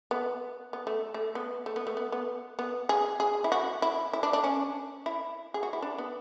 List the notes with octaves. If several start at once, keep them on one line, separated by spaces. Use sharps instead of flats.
B3
B3
A3
A3
B3
A3
B3
A3
B3
B3
B3
G#4
G#4
E4
F#4
E4
E4
D4
D4
C#4
E4
G#4
F#4
E4
D4
B3